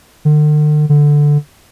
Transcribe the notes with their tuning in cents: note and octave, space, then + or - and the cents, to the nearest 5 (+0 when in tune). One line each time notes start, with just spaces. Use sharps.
D3 +45
D3 +0